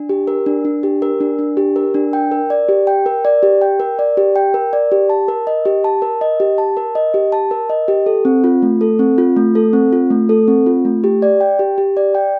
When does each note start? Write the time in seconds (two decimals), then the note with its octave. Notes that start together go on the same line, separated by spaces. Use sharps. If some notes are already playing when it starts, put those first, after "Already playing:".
Already playing: D4
0.09 G4
0.27 A#4
0.46 D4
0.65 D4
0.83 G4
1.02 A#4
1.20 D4
1.39 D4
1.57 G4
1.76 A#4
1.94 D4
2.13 G5
2.31 A#4
2.50 D5
2.69 G4
2.87 G5
3.06 A#4
3.25 D5
3.43 G4
3.61 G5
3.80 A#4
3.99 D5
4.17 G4
4.36 G5
4.54 A#4
4.73 D5
4.92 G4
5.10 A5
5.28 A#4
5.47 D#5
5.65 G4
5.84 A5
6.02 A#4
6.21 D#5
6.40 G4
6.58 A5
6.77 A#4
6.95 D#5
7.14 G4
7.32 A5
7.51 A#4
7.69 D#5
7.88 G4
8.06 A4
8.25 C4
8.44 F4
8.62 A3
8.81 A4
8.99 C4
9.18 F4
9.37 A3
9.55 A4
9.73 C4
9.93 F4
10.10 A3
10.29 A4
10.48 C4
10.66 F4
10.85 A3
11.04 G4
11.22 D5
11.41 G5
11.59 G4
11.78 G4
11.97 D5
12.15 G5